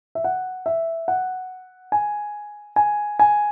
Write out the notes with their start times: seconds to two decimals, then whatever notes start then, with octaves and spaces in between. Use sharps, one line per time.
0.15 E5
0.24 F#5
0.66 E5
1.08 F#5
1.92 G#5
2.76 G#5
3.19 G#5